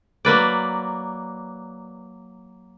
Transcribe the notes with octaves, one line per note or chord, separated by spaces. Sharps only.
F#3 A#3 B4 D5